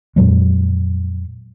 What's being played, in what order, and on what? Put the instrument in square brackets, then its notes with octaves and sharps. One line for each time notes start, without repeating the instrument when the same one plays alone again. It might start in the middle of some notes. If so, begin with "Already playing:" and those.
[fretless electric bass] F2 A#2 F#3 G#3